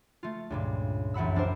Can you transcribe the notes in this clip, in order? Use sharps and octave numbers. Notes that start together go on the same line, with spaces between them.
A3 F4
C#2 G2 A#2
A1 F#2 F#5 B5 E6
C4 D4 A#4 C5